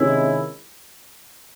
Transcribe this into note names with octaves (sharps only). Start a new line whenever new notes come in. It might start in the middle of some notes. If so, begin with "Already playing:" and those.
Already playing: C3 D#3 G#3 C#4 E4